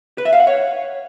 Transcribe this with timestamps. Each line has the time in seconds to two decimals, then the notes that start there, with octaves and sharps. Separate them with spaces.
0.18 B4
0.25 E5
0.33 F5
0.40 F#5
0.47 C#5